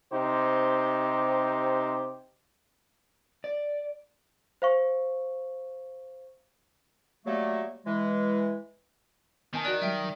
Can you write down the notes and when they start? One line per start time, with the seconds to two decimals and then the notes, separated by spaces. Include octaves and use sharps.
0.13 C3 D#4 G4 C5
3.44 D5
4.62 C5 F5 C#6
7.25 F#3 G3 A3 A#3
7.85 E3 G#3
9.54 D#3 B3 G#5 A5
9.65 F#4 D5 F#6
9.82 F#3 G3 E5 G5